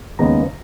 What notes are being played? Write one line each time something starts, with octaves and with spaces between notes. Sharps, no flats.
D#2 C#3 G#3 B3 A#5